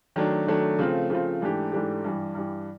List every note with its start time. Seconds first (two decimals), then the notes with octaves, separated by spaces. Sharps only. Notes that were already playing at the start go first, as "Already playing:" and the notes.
0.16 D#3 F#3 A3 D4
0.47 D#3 F#3 A3 D4
0.79 C#3 F3 A3 C4 F4
1.10 C#3 F3 A3 C4 F4
1.41 G#2 E3 A3 D4 G4
1.72 G#2 E3 A3 D4 G4
2.04 G2 E3 G3
2.35 G2 E3 G3